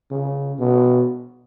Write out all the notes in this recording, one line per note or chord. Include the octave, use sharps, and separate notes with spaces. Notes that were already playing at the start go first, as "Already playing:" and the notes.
C#3
B2